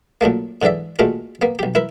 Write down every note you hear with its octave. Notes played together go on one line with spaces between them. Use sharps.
A#2 F#3 A3 A#3
G#2 D3 E3 D5 E5
A#2 G#3 A3 F4 F#4
A#3 B3
B1 G4
E4 A#4 B4